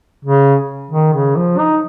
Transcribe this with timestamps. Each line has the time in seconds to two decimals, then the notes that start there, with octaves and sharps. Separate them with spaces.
0.25 C#3
0.91 D#3
1.13 C#3
1.36 F3
1.58 D#4